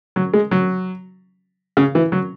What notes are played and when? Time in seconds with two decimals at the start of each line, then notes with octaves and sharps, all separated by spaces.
0.16 F#3
0.34 G#3
0.51 F#3
1.77 C#3
1.95 E3
2.12 F#3